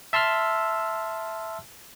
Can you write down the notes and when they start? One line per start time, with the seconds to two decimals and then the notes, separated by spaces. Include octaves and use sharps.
0.13 E5 A5 C6 E6 F6